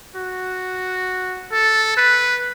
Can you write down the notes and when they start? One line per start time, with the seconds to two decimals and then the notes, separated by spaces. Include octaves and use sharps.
0.16 F#4
1.52 A4
1.97 B4